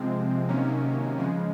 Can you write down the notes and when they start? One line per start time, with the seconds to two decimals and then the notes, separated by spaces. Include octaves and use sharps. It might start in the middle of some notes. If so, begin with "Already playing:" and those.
Already playing: C3 F3 G#3 C4
0.49 C3 D#3 F#3 A#3 C#4
1.19 C#3 F3 G#3